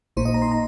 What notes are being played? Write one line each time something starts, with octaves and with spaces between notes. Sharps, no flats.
A#1 A#2 A#3 D#4 C5
D#5
A#5
C6
A#5